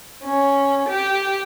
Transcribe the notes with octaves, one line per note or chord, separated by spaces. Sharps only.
C#4
G4